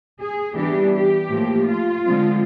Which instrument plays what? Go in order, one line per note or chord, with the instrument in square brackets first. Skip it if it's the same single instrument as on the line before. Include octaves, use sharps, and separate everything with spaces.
[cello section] G#4
E3 G3 B3 D4 G4
G4
A2 F3 A#3
F4
D3 F3 G#3 C4